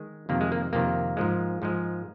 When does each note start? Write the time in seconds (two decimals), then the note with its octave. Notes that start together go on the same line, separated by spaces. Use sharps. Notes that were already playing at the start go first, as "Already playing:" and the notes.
Already playing: D#3 G#3
0.29 F2 C3 D#3 A#3
0.41 G#3
0.52 A#3
0.73 F2 C3 D#3 A#3
1.17 G#2 F3 G#3
1.62 G#2 F3 G#3